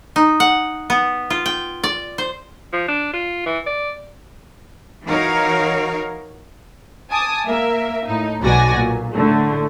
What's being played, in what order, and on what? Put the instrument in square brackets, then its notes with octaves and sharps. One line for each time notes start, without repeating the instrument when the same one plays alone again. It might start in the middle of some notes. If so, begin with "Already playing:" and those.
[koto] D#4
F#5
B3
F4
G5
D5
C5
[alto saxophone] F3
D4
F4
E3
D5
[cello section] E3 D#4 F#4 A#4 C#5 F5
[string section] G#5 A5 D6 D#6
A#3 A#4 E5
A2 D#4
B1 B2 F#4 D5 G#5 A#6
A#2
A2 D3 A3